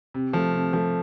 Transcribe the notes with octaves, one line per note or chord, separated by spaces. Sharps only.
C3
F3 A3
C3
F3 A3